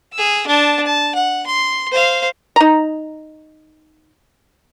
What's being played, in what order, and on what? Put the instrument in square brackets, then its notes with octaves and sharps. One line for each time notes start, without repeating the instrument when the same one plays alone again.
[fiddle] G#4 E6
D4 A5
A5
F#5
C6
C5 F5
[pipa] D#4 A#5